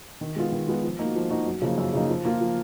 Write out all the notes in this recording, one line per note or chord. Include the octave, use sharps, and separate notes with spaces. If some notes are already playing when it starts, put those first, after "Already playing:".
D#3
G#3 B3 F4
D#3
G#3 B3 F4
F3
A#3 D#4 F#4
F3
A#3 D#4 F#4
F#2
C#3 F3 A#3 D#4
F#2
C#3 F3 A#3 D#4
F3
A#3 F4
F3